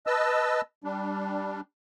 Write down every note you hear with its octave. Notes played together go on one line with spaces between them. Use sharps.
B4 D#5 A5 E6
G3 D4